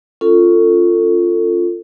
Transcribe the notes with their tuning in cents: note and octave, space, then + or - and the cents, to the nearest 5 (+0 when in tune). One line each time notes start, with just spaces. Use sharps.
C#4 +0 F4 +0 A4 +20